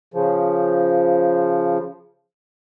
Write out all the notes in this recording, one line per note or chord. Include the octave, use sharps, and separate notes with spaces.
C#3 F3